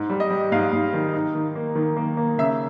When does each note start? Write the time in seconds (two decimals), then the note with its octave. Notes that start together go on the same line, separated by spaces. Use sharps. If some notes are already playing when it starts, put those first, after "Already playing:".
Already playing: G#2
0.10 G3
0.20 D#5
0.30 G3
0.52 G#2 F5
0.73 G#2
0.93 D#3
1.14 D#4
1.35 D#3
1.56 A#3
1.75 D#3
1.97 A#3
2.17 A#3
2.38 C#3 E5